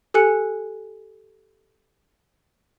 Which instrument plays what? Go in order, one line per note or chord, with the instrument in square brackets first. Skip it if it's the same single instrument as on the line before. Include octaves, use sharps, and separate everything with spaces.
[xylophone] G4 A4 G#5 F#6 C#7